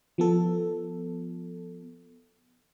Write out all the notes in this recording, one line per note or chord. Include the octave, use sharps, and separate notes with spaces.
F3 B3 A4